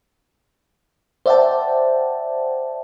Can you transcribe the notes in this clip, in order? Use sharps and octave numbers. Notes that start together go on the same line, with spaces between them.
C5 D5 E5 F#5 G5 A5